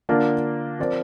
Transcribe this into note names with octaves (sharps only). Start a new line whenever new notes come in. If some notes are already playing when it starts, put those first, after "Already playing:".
D3 A#3 D4 F4 A#4
F3 C4 A#4 D5